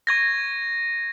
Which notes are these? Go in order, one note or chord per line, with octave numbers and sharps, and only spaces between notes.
C#6 G#6 A#6